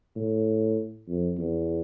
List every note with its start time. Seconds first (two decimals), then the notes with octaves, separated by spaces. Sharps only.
0.16 A2
1.08 F2
1.38 E2